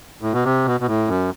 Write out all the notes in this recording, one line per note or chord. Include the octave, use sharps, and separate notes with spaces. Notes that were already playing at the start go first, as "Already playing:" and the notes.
A2
B2
C3
B2
B2
A2
F#2